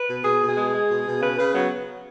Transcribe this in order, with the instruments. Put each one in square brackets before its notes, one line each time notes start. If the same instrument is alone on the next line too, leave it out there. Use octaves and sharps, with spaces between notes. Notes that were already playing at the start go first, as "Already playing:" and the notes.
Already playing: [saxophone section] B4
B2
B2 G#4
B2
G#4
G#3
G#3
B2
B2
C#3 B4
C#3 B4
F#3 B3